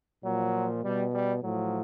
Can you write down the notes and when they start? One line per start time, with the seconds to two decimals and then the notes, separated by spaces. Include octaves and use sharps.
0.24 A#2 F3 F#3
0.83 B2 G3
1.14 G3
1.43 A2 F3 F#3